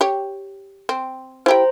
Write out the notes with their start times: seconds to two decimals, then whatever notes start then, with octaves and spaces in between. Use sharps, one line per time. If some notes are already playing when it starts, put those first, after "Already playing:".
0.01 G4 C#5
0.89 C4
1.46 E4 G4 C5 G5 A#5